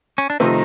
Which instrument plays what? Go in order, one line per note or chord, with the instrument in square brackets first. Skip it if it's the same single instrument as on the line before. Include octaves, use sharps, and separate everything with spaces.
[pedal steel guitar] C#4
D4
[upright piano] C3 F3 A3 C4 [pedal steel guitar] D#3 D#4